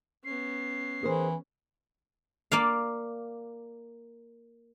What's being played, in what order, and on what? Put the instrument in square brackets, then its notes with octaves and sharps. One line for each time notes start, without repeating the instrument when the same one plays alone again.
[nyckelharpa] B3 C#4 [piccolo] C7
[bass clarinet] E3 [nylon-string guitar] G#4 A#4 C5
[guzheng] A#3 D5 F5